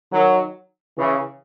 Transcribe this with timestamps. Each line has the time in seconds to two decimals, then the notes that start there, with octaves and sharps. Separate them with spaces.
0.12 D#3 F#3
0.97 C#3 E3